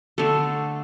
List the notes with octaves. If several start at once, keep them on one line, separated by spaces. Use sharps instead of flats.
D3 A3 A4